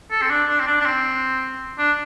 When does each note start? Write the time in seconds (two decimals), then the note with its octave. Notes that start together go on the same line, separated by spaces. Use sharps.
0.11 A4
0.22 C4
0.30 D4
0.48 D4
0.60 C4
0.67 D4
0.81 D4
0.85 C4
1.78 D4